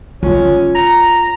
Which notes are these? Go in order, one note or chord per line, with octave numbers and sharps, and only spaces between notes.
C#4 F4
A#5